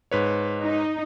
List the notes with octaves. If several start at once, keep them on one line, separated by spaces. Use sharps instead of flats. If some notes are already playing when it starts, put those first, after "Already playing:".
G#2 B4 C#5
D#4